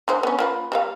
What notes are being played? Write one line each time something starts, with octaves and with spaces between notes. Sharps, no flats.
D3 G#3 C5
B3 C#4
A#3 F4 B4
G3 A#3 F5